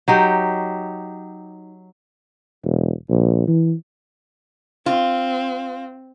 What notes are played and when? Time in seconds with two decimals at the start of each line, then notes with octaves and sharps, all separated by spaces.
0.08 F#3 D#4 G4
2.64 E1
3.09 A#1
3.47 E3
4.86 C4 F4